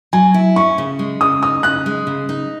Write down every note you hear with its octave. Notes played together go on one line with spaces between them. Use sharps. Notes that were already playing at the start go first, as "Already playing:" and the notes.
F#3 G#5
E4
C#4 C#6
C#3
G#3
C#3 D#6
D#4 D#6
C#3 F#6
G#3
C#3
D#4